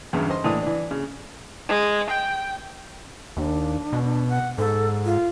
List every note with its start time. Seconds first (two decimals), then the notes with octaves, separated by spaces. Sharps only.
0.13 B1 E2 G2 C#3
0.30 C5 D#5 C6
0.44 A2 E3 D4 D#6
0.62 E3 D4
0.91 C#3
1.68 G#3
2.10 G5
3.37 D#2 D4
3.93 B2
4.29 F#5
4.58 G#2 A4
5.05 F4